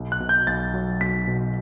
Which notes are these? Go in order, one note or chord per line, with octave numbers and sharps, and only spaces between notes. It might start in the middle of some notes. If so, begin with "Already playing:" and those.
Already playing: B1
F#6
B2
G6
B1 A6
F#3
B1 B6
B2